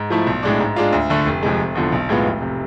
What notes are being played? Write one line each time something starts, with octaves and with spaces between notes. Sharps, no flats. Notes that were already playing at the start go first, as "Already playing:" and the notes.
Already playing: G#2
F3 A3 E4
B1
A2 G#3 D4
G#2
G#3 D4 F4
D2
D3 A3
F1
F2 C3 G#3
F1
E2 D3 F3
B1
A2 G#3 B3 F4
F1
C3